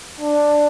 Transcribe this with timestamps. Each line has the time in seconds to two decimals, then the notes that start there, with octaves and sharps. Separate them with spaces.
0.21 D4